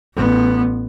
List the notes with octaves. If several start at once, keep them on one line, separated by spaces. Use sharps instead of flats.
A1 B3